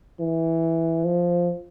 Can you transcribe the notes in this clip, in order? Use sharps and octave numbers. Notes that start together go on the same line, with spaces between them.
E3
F3